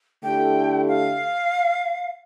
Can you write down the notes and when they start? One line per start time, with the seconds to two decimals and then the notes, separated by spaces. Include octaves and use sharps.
0.23 D3 A3 E4 G4 G5
0.88 F5